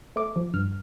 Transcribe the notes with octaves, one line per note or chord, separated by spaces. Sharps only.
A3 D6
F3
G2 F6